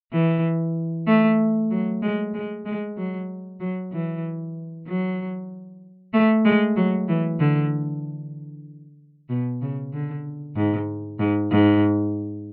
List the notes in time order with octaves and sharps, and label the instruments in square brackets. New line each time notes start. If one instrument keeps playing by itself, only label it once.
[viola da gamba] E3
A3
F#3
G#3
G#3
G#3
F#3
F#3
E3
F#3
A3
G#3
F#3
E3
D3
B2
C#3
D3
G#2
G#2
G#2